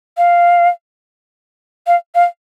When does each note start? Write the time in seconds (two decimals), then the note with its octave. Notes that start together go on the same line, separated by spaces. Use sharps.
0.17 F5
1.87 F5
2.15 F5